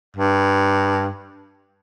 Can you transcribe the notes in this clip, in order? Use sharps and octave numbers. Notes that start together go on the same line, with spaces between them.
G2